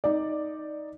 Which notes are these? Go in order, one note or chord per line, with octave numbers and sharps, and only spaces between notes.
D#4 D5